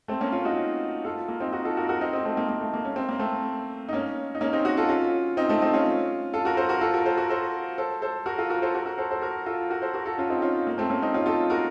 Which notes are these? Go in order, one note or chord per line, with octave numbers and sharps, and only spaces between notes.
A3 C4
A#3 C#4
C#4 F4
D#4 F#4
F4 A4
A#3
C4 D#4
D#4 F#4
F4 A4
F#4 A#4
F#4 A#4
C4 D#4
C4 D#4
A3 C4
A#3
A#3
A3
A#3
C#4
C4
A#3
A3 C4
D#4
A#3 C#4
D#4
A#3 C#4
C4 D#4
D#4 F#4
F4 A4
C#4 F4
C4 D#4
A3 C4
C4 D#4
C#4 F4
F4 A4
F#4 A#4
A4 C5
F#4 A#4
F4 A4
F#4 A#4
A4 C5
F#4 A#4
A4 C5
A4 C5
A4 C5
F#4 A#4
F4 A4
F#4 A#4
A4 C5
F#4 A#4
F#4 A#4
A4 C5
A4 C5
F#4 A#4
F4 A4
F#4 A#4
A4 C5
F#4 A#4
F4 A4
C#4 F4
C4 D#4
C#4 F4
A#3
A3 C4
A#3 C#4
C4 D#4
C#4 F4
F4 A4
F#4 A#4